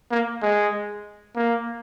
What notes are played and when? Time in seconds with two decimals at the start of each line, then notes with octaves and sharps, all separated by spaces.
0.11 A#3
0.42 G#3
1.36 A#3